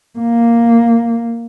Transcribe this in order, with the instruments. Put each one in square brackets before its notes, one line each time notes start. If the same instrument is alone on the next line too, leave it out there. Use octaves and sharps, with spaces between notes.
[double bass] A#3